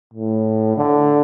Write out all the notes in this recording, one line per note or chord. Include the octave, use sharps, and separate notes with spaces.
A2
D3